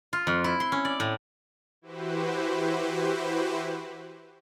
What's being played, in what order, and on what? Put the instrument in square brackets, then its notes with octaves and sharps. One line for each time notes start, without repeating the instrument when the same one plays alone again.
[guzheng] F4
F2
E4
C6
C#4
D5
A2
[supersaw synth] E3 E4 F#4 G4 B4 C5